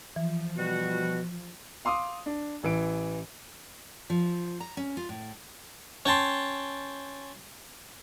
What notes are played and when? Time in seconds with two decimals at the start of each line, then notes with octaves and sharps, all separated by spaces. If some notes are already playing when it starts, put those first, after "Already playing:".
0.16 E3 F3
0.57 B2 G3 F#4
1.85 F5 C6 D6 D#6
2.26 D4
2.63 A1 E3 D7
4.10 F3
4.60 A#5
4.77 C#4
4.97 F4
5.09 A2
6.06 C#4 G5 A5 C6